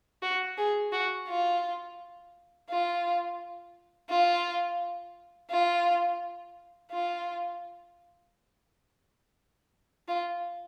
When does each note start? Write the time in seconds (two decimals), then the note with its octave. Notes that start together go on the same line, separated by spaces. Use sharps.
0.22 F#4
0.58 G#4
0.93 F#4
1.28 F4
2.69 F4
4.10 F4
5.50 F4
6.91 F4
10.08 F4